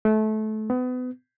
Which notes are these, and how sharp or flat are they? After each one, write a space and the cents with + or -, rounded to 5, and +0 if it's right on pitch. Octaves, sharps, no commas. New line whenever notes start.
A3 -25
B3 +30